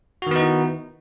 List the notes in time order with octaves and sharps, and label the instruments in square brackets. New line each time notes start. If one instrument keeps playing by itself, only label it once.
[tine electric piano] F#4
D#3
B3
D#4
E4